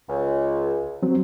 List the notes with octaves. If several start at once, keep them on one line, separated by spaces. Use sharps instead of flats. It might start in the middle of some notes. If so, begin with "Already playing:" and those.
C#2
F#3 C4 F#4